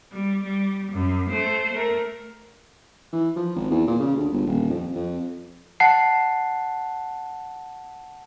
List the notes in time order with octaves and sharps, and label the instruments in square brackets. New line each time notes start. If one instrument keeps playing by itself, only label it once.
[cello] G3
G3
F#2
A3 C5
A3 A#4
[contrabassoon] E3
F3
G#1
E2
A#2
C#3
D2
G1
D#1
F2
F2
[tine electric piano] F#5 A5 C7